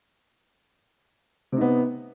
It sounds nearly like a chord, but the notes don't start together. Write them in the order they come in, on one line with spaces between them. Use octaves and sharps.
C3 D#4 B3